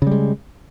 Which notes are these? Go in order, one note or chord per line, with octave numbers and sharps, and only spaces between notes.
C#3 G3 G#3